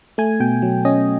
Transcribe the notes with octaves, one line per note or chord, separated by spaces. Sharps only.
A3 G#5
B2 G5
F#3
C#4 D#5